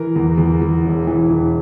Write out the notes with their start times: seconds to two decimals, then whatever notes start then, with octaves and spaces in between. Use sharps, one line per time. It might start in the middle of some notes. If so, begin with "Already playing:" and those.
Already playing: E3 A#4
0.16 E2
0.37 E2
0.61 E2
0.85 E1
1.07 E3
1.29 E1